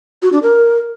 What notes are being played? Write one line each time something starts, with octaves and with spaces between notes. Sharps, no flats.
F#4
D4
A#4